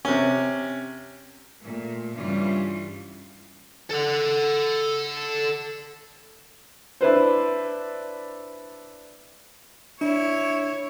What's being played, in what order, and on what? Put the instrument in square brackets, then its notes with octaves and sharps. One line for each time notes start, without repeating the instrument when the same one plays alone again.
[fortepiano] C3 C#4
[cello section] A#2 A3
G2 C#3 E3 G3 F4
[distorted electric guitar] A4 F#5
[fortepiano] D4 E4 B4 C5
[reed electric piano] D4 [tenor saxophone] E4 [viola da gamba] C#5